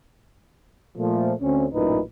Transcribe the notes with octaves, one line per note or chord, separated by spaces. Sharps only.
A#2 F3 A3
D2 D3 C4 C#4
A1 F#2 A#2 E3 D#4 B4